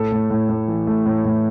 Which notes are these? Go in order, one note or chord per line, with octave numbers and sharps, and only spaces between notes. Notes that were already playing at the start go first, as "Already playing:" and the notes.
Already playing: A2 A4
A2
A2
A2
E3
A3
A2
A2